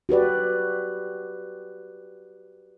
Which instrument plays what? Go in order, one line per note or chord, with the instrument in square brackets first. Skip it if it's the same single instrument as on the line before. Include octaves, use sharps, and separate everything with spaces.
[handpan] F#4 G4 B4 D5